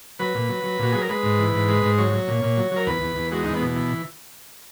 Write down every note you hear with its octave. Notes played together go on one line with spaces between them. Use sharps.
F#3 B4
A#2
F#3
F#3
A#2 F#4
F#3 G#4
A#4
G#3 B4
G#2
E3
G#2
G#3
G#2
F#3 C#5
F#3
A#2
A#2
F#3
F#3 A#4
E2 B4
E2
E2
G#3 F#4
E2 D#4
B3
B2
E3